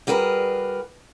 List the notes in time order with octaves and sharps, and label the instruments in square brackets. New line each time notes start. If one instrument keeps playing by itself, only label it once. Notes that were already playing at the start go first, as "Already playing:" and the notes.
[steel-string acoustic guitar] G3 F#4 G#4 A#4 B4